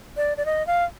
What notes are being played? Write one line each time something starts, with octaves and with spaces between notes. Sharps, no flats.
D5
D5
D#5
F5